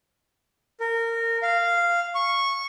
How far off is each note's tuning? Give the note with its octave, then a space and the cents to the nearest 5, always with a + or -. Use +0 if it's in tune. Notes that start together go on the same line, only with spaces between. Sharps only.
A#4 -20
F5 -10
C#6 -10